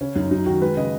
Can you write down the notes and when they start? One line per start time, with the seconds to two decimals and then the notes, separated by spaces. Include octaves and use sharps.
0.01 C#3 C#4
0.16 F#2 D#4
0.31 F#3 D#4
0.46 D#3 F#4
0.61 G#3 B4
0.77 C#3 D#5